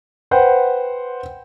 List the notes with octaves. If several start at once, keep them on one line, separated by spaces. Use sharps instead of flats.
B4 C5 F#5 G5